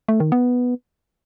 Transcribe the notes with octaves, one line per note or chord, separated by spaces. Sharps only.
A3
D#3
B3